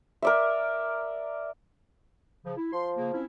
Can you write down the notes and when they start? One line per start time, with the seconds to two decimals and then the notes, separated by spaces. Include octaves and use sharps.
0.22 A#4 D5 E5
2.45 C#3 F3
2.57 E4
2.73 F3 C6
2.96 C#3 A#3
3.13 C4 C#4 E4